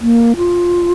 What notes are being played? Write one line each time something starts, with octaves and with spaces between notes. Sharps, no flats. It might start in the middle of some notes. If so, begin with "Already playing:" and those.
A#3
F4